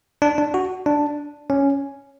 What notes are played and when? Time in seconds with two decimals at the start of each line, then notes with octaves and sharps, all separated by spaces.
0.22 D4
0.38 D4
0.54 F#4
0.86 D4
1.50 C#4